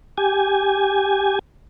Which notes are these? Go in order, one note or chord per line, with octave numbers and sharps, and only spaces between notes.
G4 G#5